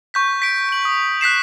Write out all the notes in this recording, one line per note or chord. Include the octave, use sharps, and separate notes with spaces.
C#6 G6 B6
B6 D7
D7 F#7
D#6
F#6 B6 C7 E7